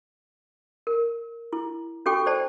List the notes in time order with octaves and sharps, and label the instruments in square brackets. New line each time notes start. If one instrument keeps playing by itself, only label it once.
[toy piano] A#4
E4
C#4 F#4 A4 G5 C#6
C5 D5 A5